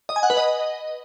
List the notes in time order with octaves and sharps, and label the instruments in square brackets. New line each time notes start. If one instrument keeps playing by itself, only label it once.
[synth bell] D#5
G#5
F#5
B4
D#5